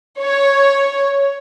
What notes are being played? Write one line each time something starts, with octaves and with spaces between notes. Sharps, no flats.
C#5